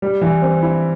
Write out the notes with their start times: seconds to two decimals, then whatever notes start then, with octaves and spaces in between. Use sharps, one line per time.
0.02 G3
0.21 E3
0.42 C4
0.62 E4